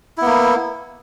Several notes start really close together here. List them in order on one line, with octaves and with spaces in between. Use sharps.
E4 B3 A#3